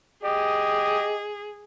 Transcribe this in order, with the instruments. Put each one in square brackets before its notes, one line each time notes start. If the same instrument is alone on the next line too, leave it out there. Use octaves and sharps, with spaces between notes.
[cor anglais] G4 [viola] G#4 [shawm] D#5